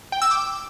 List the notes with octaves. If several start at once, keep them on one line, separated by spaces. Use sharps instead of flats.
G5
E6
D6